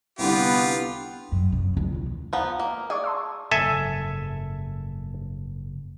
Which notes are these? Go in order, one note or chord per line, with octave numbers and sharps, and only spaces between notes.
C2 D3 B3 F4 G4
F#2
C#3
C#2
D#2
F3 B3 F5 A#5
A#3
G#4 D5 C#6 D6
A5 C6 E6
F#1 G#2 A4 E5 G#5